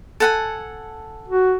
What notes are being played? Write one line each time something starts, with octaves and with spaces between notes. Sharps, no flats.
A4 F#5 G#5
F#4